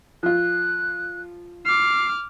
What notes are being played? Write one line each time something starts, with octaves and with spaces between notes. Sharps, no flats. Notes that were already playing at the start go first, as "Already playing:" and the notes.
F3 F4 F#6
D6 F6 C7